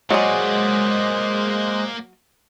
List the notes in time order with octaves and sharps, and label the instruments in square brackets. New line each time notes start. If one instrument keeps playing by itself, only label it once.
[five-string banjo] F#3 G#4 [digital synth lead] G#3 [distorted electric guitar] A#3 D5 [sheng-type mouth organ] C5 D#5 F#6